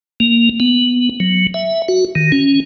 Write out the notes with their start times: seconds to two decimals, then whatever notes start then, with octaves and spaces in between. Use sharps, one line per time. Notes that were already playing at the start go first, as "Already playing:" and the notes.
0.20 A#3
0.60 B3
1.20 F#3
1.54 E5
1.88 F#4
2.15 D#3
2.32 C#4